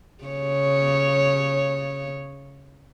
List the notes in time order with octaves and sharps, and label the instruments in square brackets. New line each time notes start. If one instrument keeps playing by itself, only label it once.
[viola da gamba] C#3 C#5